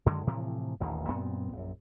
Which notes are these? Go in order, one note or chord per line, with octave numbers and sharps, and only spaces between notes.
F#2 D3 D#3 G#3
A2 C3 E3 F3
D#1 A1 D#2 D#3
F#2 A#2 B3 C4
A#1 F#2